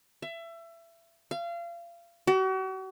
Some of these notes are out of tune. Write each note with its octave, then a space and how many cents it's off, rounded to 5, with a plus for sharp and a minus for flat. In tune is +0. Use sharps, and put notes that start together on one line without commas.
E5 +25
F5 -30
F#4 +40